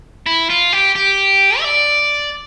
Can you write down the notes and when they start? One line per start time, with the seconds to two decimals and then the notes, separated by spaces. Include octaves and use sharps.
0.26 E4
0.50 F4
0.73 G4
0.95 G4
1.59 E5
1.65 D5